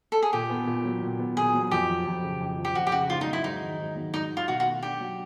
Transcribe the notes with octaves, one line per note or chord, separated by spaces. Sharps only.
A4
G#4
A#2 G4
B3
A#2
F#3
A#2
B3
A#2 G#4
F#3
F2 G4
F3
F2
C#3
F2
F3
G4
F2 F#4
G4
C#3 F#4
G#2 F4
D#4
F#3
E4
G#2 D#4
D#3
G#2
F#3
G#2 D#4
D#3
F4
B2 F#4
F#4
A3
D4 G4
F#3